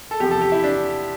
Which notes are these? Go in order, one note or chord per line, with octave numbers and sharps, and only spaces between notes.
A4
E2 C3 F3 G4
A4
G4
E4
D4